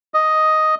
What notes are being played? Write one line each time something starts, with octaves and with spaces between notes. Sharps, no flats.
D#5